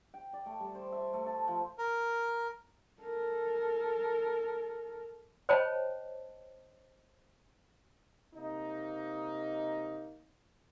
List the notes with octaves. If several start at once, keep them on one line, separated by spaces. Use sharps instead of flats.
G5
D5
A3
G3
C5
E5
A3
A5
F3
A#4
A4 A#4
C5 C#5 D#5 G5 A5 B5
C3 A#3 D#4